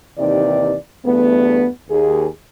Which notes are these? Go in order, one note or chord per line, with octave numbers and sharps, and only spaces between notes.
D#2 C3 E3 D#4 D5
E2 G2 A3 B3
D#2 G#4